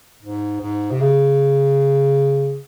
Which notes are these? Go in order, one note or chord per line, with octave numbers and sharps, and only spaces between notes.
G#2
G#2
C3
C#3